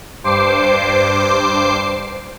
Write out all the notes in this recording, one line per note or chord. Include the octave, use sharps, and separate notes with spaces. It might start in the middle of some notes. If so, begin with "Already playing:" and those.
G2 C5 D6 C7